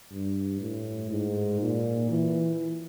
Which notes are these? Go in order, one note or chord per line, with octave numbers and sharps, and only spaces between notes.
G2
A2
G#2
A#2
E3